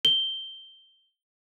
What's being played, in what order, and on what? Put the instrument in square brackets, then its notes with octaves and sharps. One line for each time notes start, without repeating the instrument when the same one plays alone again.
[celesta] G7